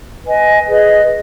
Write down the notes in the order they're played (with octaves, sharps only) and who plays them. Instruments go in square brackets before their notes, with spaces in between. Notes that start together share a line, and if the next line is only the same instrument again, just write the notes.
[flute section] B4 D#5 G#5
G#4 B4 D#5